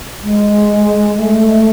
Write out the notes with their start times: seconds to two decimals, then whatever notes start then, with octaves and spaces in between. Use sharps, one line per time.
0.23 G#3
1.18 A3